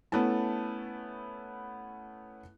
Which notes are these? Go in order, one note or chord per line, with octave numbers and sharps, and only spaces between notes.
A3 B3 C#4 E4 A5